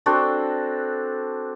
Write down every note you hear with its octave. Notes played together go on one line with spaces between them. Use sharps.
C4 D4 F#4 A4